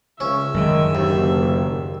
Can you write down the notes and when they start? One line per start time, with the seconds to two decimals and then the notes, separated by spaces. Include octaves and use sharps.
0.20 C#2 C#4 E5
0.54 F#2 A2 D3 D#3 G#3
0.95 F#1 D#2